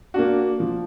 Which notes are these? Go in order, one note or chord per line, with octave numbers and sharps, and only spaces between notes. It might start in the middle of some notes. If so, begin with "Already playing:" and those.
A#3 D4 F#4
F3